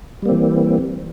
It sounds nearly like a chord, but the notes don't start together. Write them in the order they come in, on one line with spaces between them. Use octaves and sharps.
G3 A#3 C4 E3